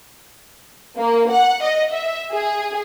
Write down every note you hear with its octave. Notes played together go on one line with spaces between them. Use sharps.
A#3
F#5
D#5
E5
G#4